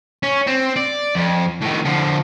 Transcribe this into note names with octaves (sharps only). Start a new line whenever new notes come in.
C#4
C4
D5
F2
A2 D#3
D3 F3